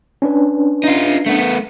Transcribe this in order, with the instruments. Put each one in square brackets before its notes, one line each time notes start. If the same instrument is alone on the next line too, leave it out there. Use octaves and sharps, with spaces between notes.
[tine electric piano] C#4 D4 B4
[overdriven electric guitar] D#4 F4
A3 B3